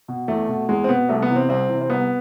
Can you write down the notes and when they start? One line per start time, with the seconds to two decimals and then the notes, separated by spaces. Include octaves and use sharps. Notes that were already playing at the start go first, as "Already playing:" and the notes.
0.08 B2
0.28 E2 A3
0.49 B2
0.69 E2 G#3
0.84 C4
0.89 B2 B3
1.09 C2 A3
1.22 B3
1.29 C3 E3
1.36 C4
1.49 C2 C4
1.69 C3 E3
1.81 C4
1.89 C2 B3